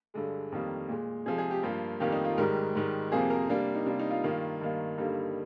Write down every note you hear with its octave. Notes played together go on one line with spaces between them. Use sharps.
G2 D3 G#3
F2 D#3 G3 A#3
A#2 G#3
C3 F3 G#3 G#4
G#4
G4
G2 F3 A#3 F4
F2 D#3 G3 A#3 G4
D#4
F4
G#2 D#3 G3 A#4
G#2 D#3 G3
F2 C3 F3 A#3 G#4
A#4
C3 G3 A#3 D4
D#4
C3 G3 A#3 D4
D#4
F4
G2 D#3 A#3
G2 D#3 A#3
G2 D3 G3 A#3 D#4